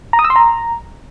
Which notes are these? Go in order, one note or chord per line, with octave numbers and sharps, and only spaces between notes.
A#5
D#6
E6
C6
A#5